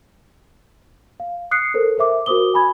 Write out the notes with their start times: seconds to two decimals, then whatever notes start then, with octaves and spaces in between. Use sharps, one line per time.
1.20 F5
1.51 D#6 F#6 C7 C#7
1.74 A4 A#4 C5
1.98 A#4 C5 E5 D6
2.26 F#4 A#4 C5 D6 D#6 G7
2.54 G#5 B5 G#6